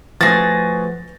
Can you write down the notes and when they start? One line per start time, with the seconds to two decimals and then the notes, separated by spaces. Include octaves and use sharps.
0.21 F3 A3 F#4 G#4 B4 A6 A#6